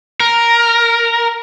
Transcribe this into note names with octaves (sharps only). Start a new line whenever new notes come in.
A#4